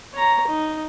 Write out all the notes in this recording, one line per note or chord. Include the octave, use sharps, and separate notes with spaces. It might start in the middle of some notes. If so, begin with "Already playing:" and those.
C#5 A#5
D#4